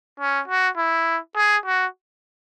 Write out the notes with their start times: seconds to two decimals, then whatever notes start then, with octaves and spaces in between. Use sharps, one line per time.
0.20 C#4
0.48 F#4
0.77 E4
1.36 G#4
1.66 F#4